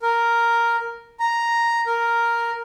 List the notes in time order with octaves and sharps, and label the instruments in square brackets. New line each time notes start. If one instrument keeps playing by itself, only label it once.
[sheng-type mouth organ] A#4
A#5
A#4